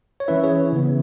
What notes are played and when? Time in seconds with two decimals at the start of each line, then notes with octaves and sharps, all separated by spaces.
0.20 C#5
0.28 E3 C#4 E4 B4 E5
0.43 G#4 C#5
0.73 C#3 E3 B3